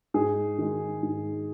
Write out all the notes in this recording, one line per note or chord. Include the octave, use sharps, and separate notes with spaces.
G#2 G#4
D#3 G#3
G#2